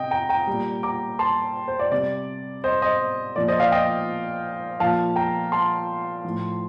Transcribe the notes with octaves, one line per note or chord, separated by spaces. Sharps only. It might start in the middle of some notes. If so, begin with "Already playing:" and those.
Already playing: C3 D#5 G5
G5 A#5
G5 A#5
A#2 G3
A#5 D6
A5 C6
C5
D5
C3 G3 D5
C5 D#5
C5 D#5
A#2 F3 D5
C5 D#5
D5 F5
D#5 G5
A#2 F3 F5 A5
G5 A#5
A5 C6
A2 F3